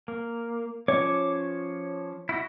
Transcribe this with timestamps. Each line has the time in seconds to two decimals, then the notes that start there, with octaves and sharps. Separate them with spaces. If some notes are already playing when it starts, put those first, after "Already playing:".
0.08 A#3
0.88 F3 C#4 C#5 D6
2.29 E4 F#4 D#5